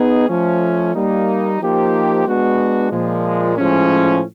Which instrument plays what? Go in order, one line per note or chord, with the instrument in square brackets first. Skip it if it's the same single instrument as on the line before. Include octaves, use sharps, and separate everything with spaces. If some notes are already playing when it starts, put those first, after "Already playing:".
Already playing: [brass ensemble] B3 D#4 G#4
F3 A3 C#4
G3 A#3 D#4
F3 A#3 D#4 G4 C5
G#3 B3 D4 F#4
A#2 F3 G#3
A2 F3 G#3 C#4